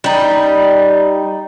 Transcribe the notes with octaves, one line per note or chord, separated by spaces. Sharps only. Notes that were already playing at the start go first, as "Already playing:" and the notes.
G3 D#4